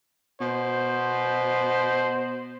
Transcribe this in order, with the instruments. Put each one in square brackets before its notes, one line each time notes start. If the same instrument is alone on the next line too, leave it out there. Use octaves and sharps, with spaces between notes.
[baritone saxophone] B2 [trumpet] C5